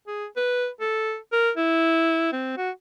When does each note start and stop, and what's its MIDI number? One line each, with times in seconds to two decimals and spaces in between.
0.07 0.26 68
0.36 0.68 71
0.81 1.16 69
1.32 1.50 70
1.57 2.30 64
2.32 2.52 60
2.57 2.71 66